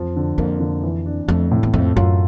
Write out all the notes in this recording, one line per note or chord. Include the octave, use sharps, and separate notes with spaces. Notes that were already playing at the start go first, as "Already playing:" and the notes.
Already playing: F2 F3
D3
F2 A#3
D3
E3
D4
F2 A3
A2
E2
F2 A3
F#2 F4